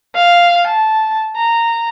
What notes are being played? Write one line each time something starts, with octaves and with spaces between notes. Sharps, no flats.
F5
A5
A#5